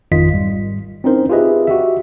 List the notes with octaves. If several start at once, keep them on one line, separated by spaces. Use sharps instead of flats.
G#1 F2 D#3 F4 D#5 B6
G#2 G3
C4 C#4 D#4 E4 A#4 C5
F4 G4 G#4 B4 D#5 E5
F#4 G4 E5